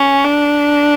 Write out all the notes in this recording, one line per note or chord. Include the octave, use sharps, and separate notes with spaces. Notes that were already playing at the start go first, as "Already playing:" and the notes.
Already playing: C#4
D4